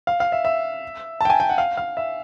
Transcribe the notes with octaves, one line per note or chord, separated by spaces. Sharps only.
F5
F5
E5
E5
G5 A5
G#5
G5
F#5
F5
F5
E5